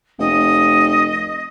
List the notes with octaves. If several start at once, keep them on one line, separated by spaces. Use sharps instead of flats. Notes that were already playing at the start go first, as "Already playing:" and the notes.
F1 D#5